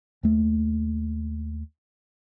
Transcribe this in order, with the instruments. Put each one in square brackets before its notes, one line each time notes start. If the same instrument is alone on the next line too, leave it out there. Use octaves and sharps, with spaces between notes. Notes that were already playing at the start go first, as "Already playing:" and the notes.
[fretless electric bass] D#2 A3